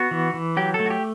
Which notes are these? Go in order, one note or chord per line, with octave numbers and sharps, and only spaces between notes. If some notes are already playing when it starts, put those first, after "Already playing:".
Already playing: B3 F#4
E3
E3
F#3 G4
A4
A3
F#4
G4